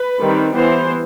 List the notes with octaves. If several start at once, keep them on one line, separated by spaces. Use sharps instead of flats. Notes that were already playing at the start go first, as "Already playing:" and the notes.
Already playing: B4
D#3 G3 C4
E3 B3 C5